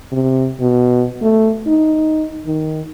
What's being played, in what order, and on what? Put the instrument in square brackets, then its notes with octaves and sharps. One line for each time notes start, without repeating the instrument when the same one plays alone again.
[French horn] C3
B2
A3
D#4
D#3